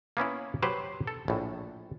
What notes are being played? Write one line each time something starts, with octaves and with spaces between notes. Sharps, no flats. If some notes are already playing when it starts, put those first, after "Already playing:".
A#3 B3 C#4 E4
F#3 G4 B4 C5
A4
A#1 A2